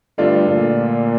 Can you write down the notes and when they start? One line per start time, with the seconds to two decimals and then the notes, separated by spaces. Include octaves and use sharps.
0.18 G2 D3 A3 D4 F4
0.51 A#2